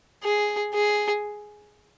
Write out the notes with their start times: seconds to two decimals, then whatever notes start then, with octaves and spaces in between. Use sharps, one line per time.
0.24 G#4
0.74 G#4